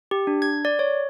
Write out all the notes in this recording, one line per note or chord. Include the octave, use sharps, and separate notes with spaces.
G4
D4
G#6
D5
C#5